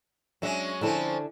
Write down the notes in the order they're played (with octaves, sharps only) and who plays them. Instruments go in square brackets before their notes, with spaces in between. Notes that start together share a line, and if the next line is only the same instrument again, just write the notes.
[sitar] F#3 G#3 C#4 [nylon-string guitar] D4 E5
[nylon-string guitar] D3 E4 A4 [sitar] F3 C4 C#4